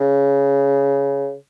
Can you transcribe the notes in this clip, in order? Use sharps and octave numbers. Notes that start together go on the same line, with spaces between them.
C#3